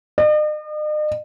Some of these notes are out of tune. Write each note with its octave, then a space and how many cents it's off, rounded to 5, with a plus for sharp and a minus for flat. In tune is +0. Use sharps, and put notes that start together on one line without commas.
D#5 -45